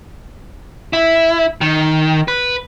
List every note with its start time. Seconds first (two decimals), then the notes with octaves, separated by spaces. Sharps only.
0.93 E4
1.61 D#3
2.28 B4